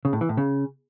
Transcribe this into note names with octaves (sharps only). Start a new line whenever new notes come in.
C#3
A2
E3
A2
C#3